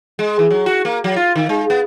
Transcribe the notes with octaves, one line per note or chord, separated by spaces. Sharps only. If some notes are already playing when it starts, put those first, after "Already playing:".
G#3
E3
F#3
F#4
A#3
F#3
F4
D#3
G#3
B3